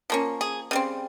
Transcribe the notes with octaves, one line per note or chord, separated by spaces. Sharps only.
F3 A#3 C#4
G#4
C#3 G3 C4